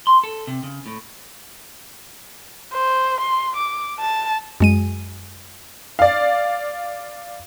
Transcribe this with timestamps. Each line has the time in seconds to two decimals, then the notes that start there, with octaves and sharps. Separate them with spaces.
0.07 C6
0.24 A4
0.47 C3
0.63 C#3
0.86 A2
2.73 C5
3.21 C6
3.57 D6
4.00 A5
4.60 F#2 G#3 D#7
5.99 D5 F5